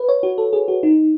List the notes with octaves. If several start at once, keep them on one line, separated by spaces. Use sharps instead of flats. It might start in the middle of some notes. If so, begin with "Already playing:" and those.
Already playing: B4
C#5
F#4
A4
G#4
F#4
D#4